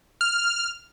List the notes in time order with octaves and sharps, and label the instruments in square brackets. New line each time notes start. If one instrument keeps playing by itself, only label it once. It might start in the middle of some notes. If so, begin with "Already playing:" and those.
[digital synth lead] F6